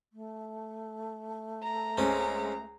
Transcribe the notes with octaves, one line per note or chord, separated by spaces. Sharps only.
A3
A#5
C#2 G#3 C4 C#4